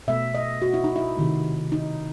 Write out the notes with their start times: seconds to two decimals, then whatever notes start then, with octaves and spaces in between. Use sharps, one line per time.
0.08 B2 A3 E5
0.35 D#5
0.62 F#4
0.74 E4
0.84 D#4
0.96 E4
1.17 C3 D#3 A3
1.72 D#4